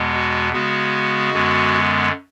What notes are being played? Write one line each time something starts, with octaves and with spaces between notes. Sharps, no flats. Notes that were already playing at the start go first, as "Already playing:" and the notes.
Already playing: E2 B2 G#3 B3
F#4
C#3 G#3 B3 F#4
F#2 D3 G#3 B3